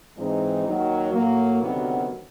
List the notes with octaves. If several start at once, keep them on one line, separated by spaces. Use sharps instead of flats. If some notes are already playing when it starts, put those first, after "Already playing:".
G#2 E3 G#3 C4 D#4
D#2 D#3 F#3
A2 F#3 A#3
D2 C3 D#3 F#3 B3